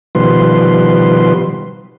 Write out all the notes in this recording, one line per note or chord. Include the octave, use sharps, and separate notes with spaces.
B2 D#3 F3 G3 B4 C6